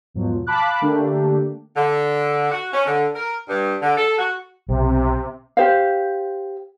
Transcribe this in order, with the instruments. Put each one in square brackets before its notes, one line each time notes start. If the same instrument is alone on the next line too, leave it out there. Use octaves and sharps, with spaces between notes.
[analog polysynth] E2 G#2 B2 F3 F#3
F5 A5 B5 D6 F#6
D3 A3 A#3 D4 G4
[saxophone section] D3
F#4
C#4
D3
A#4
G2
D3
A4
F#4
[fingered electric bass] B1 [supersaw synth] C3
[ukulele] G4 C5 F5